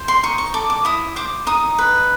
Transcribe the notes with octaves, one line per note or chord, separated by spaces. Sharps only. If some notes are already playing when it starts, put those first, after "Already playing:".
Already playing: C5
C6
D#4 C#6
C#6
A4 D6
D6
E4 D#6
C5 D6
D#4 D#6
B4